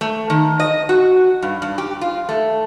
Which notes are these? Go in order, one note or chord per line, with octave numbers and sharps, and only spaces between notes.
A3
D#3
D#5
F#4
G2
G2
G4
F4
A3